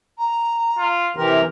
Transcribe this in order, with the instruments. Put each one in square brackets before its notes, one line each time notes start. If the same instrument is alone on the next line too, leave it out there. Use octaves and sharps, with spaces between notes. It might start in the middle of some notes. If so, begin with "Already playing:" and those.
[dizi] A#5
[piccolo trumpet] F4
[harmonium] C3 E3 G4 [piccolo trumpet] A#4 [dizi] C6